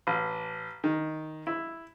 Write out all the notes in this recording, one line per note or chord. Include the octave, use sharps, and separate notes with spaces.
A1
D#3
E4